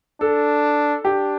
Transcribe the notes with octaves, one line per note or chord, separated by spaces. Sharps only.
D4 A4
D4 G4